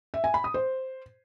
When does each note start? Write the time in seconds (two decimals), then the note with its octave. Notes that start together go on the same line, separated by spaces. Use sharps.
0.14 E5
0.24 G#5
0.34 B5
0.44 D#6
0.54 C5